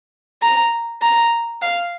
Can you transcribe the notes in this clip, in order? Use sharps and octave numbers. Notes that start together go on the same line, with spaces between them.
A#5
A#5
F5